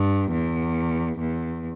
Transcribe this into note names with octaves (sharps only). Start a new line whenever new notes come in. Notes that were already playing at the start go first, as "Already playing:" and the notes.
Already playing: G2
E2
E2